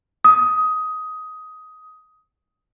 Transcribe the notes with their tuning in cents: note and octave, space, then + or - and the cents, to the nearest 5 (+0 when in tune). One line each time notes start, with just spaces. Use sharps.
D#6 +15